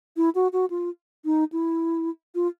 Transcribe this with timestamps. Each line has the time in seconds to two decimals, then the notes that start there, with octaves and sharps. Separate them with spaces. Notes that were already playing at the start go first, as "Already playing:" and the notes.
0.17 E4
0.35 F#4
0.53 F#4
0.70 F4
1.25 D#4
1.52 E4
2.35 F4